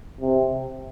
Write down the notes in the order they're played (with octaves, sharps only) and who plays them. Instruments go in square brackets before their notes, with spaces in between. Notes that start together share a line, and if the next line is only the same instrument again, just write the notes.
[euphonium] C3